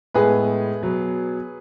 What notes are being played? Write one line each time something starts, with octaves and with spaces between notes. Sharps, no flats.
A2 G#3 B3 G#4 B4
B2 F#3 B3